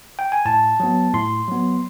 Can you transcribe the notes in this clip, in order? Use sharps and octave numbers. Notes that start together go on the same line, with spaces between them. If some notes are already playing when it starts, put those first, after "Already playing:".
G5
G#5
A2 A5
F#3 B3
A2 C6
F#3 B3